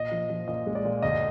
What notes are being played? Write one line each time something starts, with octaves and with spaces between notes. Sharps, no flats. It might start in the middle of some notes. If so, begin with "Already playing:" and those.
Already playing: A#2 D#5
F3
F3
A#2 D#5
G#3
D5
A#2
D2 D#5